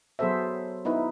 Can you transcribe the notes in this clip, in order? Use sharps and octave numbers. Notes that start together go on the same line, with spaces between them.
F#3 B3 G#4 A4 C5 E5
B3 D#4 E4 B4